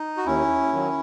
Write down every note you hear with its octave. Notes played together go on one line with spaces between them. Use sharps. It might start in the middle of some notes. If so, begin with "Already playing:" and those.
Already playing: D#4
F#4
D#2 C#4 E4
D#3 F#3